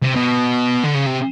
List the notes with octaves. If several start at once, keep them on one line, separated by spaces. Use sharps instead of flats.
C3
B2
D3
C#3
C3